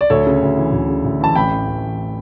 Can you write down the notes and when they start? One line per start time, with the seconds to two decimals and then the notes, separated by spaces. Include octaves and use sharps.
0.01 D5
0.10 D2 A4 C#5
0.27 C#3
0.42 D2
0.57 E3
0.72 D2
0.88 C#3
1.04 D2
1.21 E3 A5
1.35 A1 G5 B5
1.51 A2
1.68 A1
1.83 E3